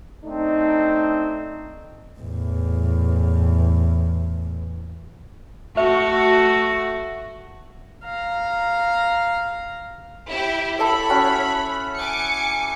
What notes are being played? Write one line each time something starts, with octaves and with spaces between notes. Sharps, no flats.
A3 C4 D4 D#4
E2 A2
A3 F#4 E5
F5 A#5
E4 G4
E4 A4 C#5 E5 B5
C#4 F#4
G#5 D6 C#7